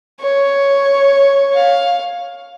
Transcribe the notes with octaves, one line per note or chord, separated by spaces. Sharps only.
C#5
F5